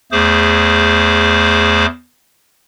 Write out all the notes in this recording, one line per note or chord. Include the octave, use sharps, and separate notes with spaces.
E2 A3 G#4 C5 D6